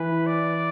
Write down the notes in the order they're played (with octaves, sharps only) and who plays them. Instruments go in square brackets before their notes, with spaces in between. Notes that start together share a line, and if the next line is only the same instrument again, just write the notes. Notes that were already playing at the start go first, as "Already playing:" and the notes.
Already playing: [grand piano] E3 [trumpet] B4
[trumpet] D5